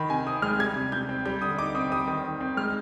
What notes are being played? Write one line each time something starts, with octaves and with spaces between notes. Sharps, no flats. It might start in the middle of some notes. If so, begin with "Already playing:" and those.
Already playing: D#3 B5
C3 G#5
C4 D#6
G#3 F6
G3 G#6
C3
C3 G6
C4
G3 G6
D3 D#6
D#4 D6
C4 D#6
G3 D#6
D#3
D#3
C4
G#3 F6